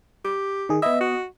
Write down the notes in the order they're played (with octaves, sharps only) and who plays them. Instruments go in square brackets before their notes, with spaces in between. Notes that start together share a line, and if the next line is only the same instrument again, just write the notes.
[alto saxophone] G4
[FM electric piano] D#3 G#4
[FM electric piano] B3 D#5 [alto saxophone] E5
[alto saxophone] F#4